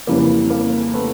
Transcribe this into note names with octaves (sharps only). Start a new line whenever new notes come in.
F2 C#3 E3 G3 A#3
A#3
A3 B3